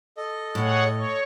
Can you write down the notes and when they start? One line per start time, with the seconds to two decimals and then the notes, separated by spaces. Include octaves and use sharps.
0.17 A4 D#5
0.55 A2 G#4 C#5 F#5
0.93 C#5